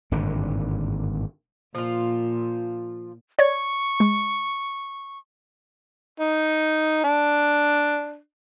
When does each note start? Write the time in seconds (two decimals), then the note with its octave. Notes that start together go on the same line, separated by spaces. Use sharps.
0.11 G#1 G2 A#2 D3
1.75 A#2 F3 F4
3.39 C#5 D5 C#6 G#6
4.00 G#3
6.20 D#4
7.04 D4